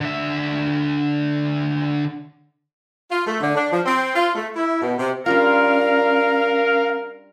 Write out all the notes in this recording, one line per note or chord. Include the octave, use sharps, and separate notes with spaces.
D3 E5
F4
A3
D3
D4
F3
C4
F4
A3
E4
B2
C3
G3 C#4 D4 F4 A#4 F5